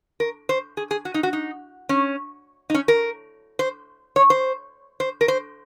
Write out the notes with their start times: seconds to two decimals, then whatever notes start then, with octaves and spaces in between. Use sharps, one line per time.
0.20 A#4
0.49 C5
0.77 G#4
0.91 G#4
1.05 F#4
1.14 D#4
1.23 F#4
1.33 D#4
1.89 C#4
2.70 D#4
2.74 C#4
2.88 A#4
3.59 C5
4.16 C#5
4.30 C5
5.00 C5
5.21 A#4
5.28 C5